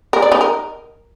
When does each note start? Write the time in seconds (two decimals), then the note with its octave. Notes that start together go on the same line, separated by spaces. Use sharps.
0.13 A#4
0.22 D5
0.32 D#4
0.41 A#4